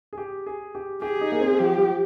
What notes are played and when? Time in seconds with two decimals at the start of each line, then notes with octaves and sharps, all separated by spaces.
0.13 G#4
0.18 G4
0.46 G#4
0.75 G4
1.02 G4 G#4
1.21 D#4
1.32 A#3
1.41 C4
1.59 F3 G4
1.78 F3